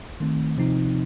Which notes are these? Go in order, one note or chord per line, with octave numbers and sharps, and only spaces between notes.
D#3 A3 C4
C3 F3 C4 D#4